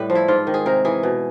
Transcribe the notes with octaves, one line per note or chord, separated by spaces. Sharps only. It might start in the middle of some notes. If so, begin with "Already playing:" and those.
Already playing: A2 G3 B4
F3
E4
G#2 F4
D#3
G#4
C3 A#4
E3 G#4
B2